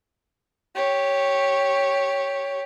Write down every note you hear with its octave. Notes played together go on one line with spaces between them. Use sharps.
G4 C#5